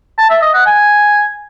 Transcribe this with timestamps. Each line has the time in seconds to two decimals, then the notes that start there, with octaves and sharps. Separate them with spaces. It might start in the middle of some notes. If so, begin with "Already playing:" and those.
0.18 A5
0.30 E5
0.42 D#5
0.54 F#5
0.66 G#5